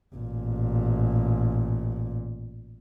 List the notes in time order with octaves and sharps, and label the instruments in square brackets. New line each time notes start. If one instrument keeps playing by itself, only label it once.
[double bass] A1 A#2